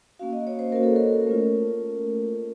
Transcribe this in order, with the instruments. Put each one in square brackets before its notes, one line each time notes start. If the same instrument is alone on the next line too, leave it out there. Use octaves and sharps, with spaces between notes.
[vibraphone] A#3 C#4 F#4 F5
D#5
C#5
C5
A#3 C#4 F#4 A#4
A4
A#4
A3 C#4 F4